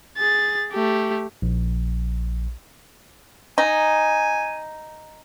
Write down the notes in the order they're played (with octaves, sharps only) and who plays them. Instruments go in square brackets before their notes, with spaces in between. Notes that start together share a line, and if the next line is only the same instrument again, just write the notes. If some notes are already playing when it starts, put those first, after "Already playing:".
[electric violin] G#4 A6
A3 G4
[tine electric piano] A#1
[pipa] D#4 [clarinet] G#5